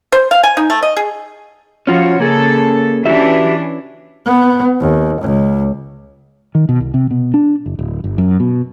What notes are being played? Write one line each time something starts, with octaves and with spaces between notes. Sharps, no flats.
C5
F5
G#5
D#4
A3
D#5
G#4
F3 C#4 F4 F#4 C#5
C#3 A#3 G#4 A4
E3 C#4 D4 F#4 G4 E5
B3
D#2
C#2
D#3
B2
C2
C3
B2
D4
F#1
D1
G1
F#2
B2